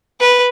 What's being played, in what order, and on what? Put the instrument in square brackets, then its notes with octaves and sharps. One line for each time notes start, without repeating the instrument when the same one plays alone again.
[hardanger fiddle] B4